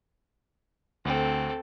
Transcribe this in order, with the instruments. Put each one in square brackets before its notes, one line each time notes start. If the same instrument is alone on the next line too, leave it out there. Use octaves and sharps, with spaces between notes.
[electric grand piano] D2 [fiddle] C4 A4